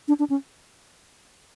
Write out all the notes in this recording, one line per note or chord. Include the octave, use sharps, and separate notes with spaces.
D4
D4
C#4